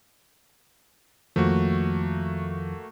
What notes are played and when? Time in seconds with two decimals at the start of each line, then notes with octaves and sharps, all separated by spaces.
1.36 F2 D#3 F3 A3 A#3 F#4